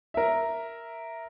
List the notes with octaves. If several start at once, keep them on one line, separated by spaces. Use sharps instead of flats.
A#4 E5